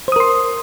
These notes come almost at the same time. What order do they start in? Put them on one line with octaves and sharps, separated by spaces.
C5 D#6 A#4 C6